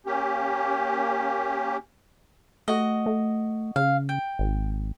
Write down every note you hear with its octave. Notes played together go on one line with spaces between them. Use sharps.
A#3 C#4 G4
A3 F#4 D#5
A3
C#3 F5
G5
G#1